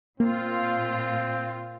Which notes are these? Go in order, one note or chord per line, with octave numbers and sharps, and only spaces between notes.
A#2 A#3 C4 F4